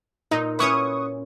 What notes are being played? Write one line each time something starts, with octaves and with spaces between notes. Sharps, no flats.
A#2 D#4
C#4 E4 F#4 B4 C#6 D#6